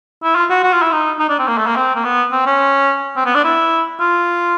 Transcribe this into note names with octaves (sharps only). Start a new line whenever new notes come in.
E4
F4
F#4
F#4
F4
E4
D#4
D#4
D4
C4
A#3
A3
A#3
C4
A#3
B3
C4
C#4
C4
B3
D4
E4
F4